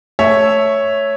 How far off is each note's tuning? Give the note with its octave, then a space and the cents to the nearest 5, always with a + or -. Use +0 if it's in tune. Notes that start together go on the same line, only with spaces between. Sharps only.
A3 +0 C#5 +0 E5 -5